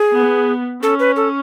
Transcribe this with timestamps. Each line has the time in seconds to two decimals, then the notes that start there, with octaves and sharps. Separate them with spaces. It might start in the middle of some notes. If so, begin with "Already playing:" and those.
Already playing: G#4
0.16 B3
0.83 C#4 A4
1.00 B4
1.16 A4